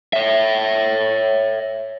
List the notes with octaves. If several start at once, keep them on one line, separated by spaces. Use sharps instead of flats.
C#5 E5